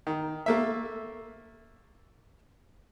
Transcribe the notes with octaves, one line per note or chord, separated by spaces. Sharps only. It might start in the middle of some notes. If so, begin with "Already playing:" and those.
D#3
A3 A#3 E5